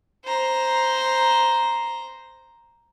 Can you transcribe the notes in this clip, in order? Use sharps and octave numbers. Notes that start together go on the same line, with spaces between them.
C5 A#5